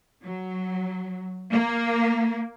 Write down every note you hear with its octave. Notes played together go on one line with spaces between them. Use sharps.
F#3
A#3